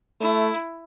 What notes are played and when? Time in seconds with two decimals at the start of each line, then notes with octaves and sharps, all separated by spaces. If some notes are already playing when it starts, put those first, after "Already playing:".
0.21 A3 E4